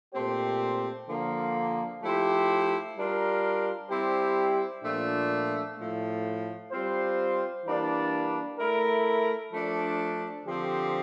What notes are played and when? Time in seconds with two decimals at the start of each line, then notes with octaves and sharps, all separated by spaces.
0.14 A#2 A3 C4 G4 C5
1.08 D3 F3 A#3
2.02 F3 A3 E4 G4 C5
2.96 G3 D4 F4 A#4
3.90 G3 C4 E4 G4 C5
4.83 A#2 F3 A3 D4
5.77 A2 F3 A3
6.72 G3 C4 F4 C5
7.65 E3 G3 A#3 D4
8.59 A3 E4 A#4
9.53 F3 A3 D4
10.46 D3 F3 C4 G4